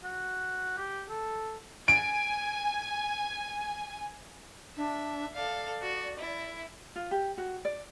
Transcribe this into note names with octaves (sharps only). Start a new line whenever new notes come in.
F#4
G4
A4
G#5 D7
D4 E5
A4 D5 F5
F#4
E4
F4
G4
F#4
D5